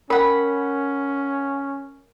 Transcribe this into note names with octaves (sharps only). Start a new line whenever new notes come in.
C#4 A#4 F#5 B5